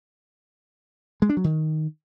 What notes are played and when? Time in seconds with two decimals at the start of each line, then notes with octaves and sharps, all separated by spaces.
1.22 G#3
1.29 D4
1.37 F#3
1.44 D#3